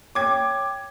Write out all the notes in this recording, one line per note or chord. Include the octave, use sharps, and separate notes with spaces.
C#5 G5 D6 G#6